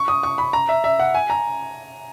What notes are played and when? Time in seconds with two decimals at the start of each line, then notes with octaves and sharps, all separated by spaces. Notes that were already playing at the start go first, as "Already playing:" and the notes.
Already playing: C#6
0.08 D#6
0.23 C#6
0.38 B5
0.53 A#5
0.69 E5
0.84 E5
1.00 F#5
1.15 G#5
1.30 A#5